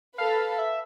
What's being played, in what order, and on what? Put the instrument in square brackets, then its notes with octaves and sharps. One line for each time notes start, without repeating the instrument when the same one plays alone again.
[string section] A4 B4 [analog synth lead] F5
[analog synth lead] E5